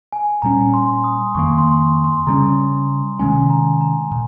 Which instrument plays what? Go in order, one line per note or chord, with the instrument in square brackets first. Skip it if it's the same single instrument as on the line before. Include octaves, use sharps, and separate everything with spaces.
[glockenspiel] G#5
[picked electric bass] A#2 G3 C#4 [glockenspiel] A#5
[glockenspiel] C6
D#6
[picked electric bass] F2 D#3 A#3 [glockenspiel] C#6
[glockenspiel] C6
C#6
C6
[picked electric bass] C#3 G3 C#4 [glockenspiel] A#5
[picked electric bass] C3 D#3 G#3 C#4 [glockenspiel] G#5
[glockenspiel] A#5
A#5
[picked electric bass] A#2